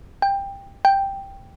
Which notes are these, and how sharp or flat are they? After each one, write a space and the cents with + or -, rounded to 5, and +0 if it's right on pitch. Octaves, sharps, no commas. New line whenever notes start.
G5 +15
G5 +0